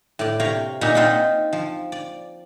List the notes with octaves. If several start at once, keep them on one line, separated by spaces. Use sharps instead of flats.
A2 D5
C3 C#5 F5 G5 A#5
A#2 D#4 E5 F#5 G#5 A#5
C4 D#4 F4 C5 E5 F#5
F3
D5